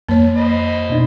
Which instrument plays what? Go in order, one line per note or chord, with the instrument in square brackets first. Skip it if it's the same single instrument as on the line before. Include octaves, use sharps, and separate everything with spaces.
[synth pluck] F2 [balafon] A#3 C#5
[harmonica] C5 D#5 B5
[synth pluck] B2 D4 D#4